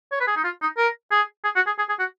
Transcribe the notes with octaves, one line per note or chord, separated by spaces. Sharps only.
C#5
B4
G#4
D#4
F4
D#4
A#4
G#4
G#4
F#4
G#4
G#4
G#4
F#4